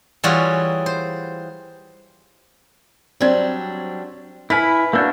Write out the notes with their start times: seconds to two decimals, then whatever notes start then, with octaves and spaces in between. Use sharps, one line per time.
0.24 E3 G3 F4 F#4 G#4 C#5
0.86 C5
3.21 F#3 G3 C4 D4 G#6
4.50 E4 B4 G#5 F6 B6
4.93 A#3 D4 F#4 E6 G6